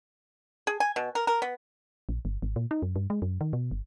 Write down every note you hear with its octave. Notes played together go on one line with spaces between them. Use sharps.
G#4
G#5
B2
A#4
A#4
B3
A#1
G1
G#1
A#2
D#4
F#2
G2
G#3
F#2
D#3
B2
G1